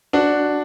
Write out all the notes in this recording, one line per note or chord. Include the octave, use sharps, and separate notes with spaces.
D4 F#4